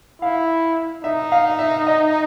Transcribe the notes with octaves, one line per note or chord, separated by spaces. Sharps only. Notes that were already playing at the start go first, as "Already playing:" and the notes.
E4 F5
D#4 E5
F5
E5
D#5